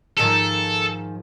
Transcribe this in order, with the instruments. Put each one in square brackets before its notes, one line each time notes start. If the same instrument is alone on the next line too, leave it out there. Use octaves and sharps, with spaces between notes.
[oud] G#2 D#3 F3 [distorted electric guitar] A4